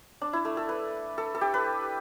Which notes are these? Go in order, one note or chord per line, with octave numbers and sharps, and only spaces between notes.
D4
E4
A3
A4
B4
A4
A4
G4
B4